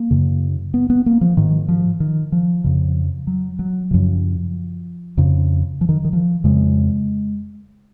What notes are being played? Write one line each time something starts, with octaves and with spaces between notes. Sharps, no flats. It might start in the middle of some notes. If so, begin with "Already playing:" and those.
Already playing: A#3
F#2 C#3
B3
B3
A#3
F3
G#2 D#3
F3
D#3
F3
F2 C#3
F#3
F#3
F#2 C#3 F3
F2 C#3
F3
D#3
D#3
F3
F2 C#3 G#3